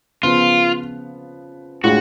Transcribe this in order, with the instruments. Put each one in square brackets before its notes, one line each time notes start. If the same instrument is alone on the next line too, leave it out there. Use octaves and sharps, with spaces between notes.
[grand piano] C#3 F3 B3 [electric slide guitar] F4
[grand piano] A2 G#3 D4 F4 G#4 [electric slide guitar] F#4